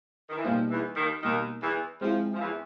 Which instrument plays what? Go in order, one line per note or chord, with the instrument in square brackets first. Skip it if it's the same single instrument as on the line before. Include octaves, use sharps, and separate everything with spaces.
[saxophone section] D#3
E3
[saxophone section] F2 F3 [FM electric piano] B2 G3 A#3 D#4
[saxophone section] E2 E3
D#2 D#3
[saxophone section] D#2 D#3 [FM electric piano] B2 G3 A#3 D#4
[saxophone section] E2 E3
[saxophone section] F2 F3 [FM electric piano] G#3 C4 E4 G#4
[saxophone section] F3
E2 E3